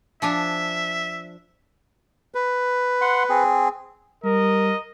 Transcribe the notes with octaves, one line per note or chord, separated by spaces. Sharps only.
F3 D4 E5 G#5
B4
F#5 C6
C4 G#4
G3 A#4 D#5